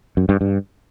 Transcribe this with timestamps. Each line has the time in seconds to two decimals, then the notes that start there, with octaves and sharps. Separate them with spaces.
0.17 F#2
0.29 G2
0.41 G2